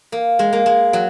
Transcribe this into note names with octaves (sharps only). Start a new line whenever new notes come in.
A#3
G#3
A#3
G#3
F#3